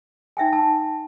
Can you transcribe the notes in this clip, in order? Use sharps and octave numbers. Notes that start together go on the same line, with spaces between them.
D#4 E5 G5 G#5
A5